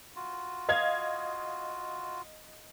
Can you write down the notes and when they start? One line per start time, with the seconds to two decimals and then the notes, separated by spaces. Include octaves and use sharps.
0.16 F4 F#4
0.69 D#5 F5 G#6